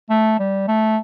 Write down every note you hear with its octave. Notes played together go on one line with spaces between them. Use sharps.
A3
G3
A3